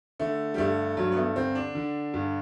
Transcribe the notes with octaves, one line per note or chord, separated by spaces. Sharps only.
D3 A3
G3
G2 A3
G2 F#3
B3
A3
D3 C4
D4
D3
G2